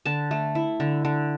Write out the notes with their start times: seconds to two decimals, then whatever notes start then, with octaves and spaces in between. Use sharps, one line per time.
0.06 D3 A5
0.31 A3
0.55 E4
0.80 D3
1.05 D3